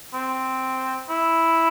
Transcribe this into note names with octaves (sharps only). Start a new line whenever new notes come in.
C4
E4